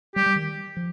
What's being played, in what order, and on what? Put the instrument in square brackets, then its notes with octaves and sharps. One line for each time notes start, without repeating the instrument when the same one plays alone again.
[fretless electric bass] G3 [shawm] G4
[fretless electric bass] G3
D#3
F3